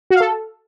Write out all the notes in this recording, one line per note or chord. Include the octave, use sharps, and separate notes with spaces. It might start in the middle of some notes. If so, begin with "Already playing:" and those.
F#4
F5
A4